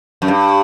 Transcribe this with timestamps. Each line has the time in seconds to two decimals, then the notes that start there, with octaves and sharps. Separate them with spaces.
0.22 F#2
0.28 G2